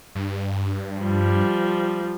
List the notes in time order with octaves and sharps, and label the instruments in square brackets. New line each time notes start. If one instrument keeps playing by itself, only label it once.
[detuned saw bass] G2
[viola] F3 G3